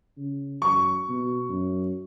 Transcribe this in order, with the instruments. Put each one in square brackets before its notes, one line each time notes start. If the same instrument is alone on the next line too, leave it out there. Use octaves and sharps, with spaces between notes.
[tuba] C#3
[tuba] F#2 [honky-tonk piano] C#6
[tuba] B2
F#2